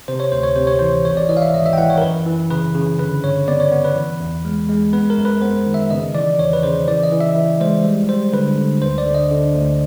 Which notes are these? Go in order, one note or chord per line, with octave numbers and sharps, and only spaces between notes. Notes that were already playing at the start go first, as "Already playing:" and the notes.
C3 C5
C#5
D2 C5
C#5
C3 C5
C#5
E3 C5
G#1 C#5
D5
E3 D#5
F5
E5
G#1 D#5
E5
G5
E3 F#5
C#5
A#4
F#2 B4
E3
C#3 B4
C#3
D3 B4
G2 C#5
B3 D5
C#5
B3
B4
E3
E2
G#3
G#3
B3 B4
A#4
F#2
B4
B3 C5
D#3
E5
C#3 D#5
E3 D5
E2 C#5
B4
C#3 C5
E3 D5
D#5
E3
E5
E3
G#3 C5
G3
G3 C5
D3 B4
D3
D2 C5
D5
D3
D#5
D3
D2